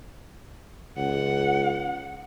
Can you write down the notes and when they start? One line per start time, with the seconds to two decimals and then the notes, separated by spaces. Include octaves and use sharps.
0.97 C#2 F#5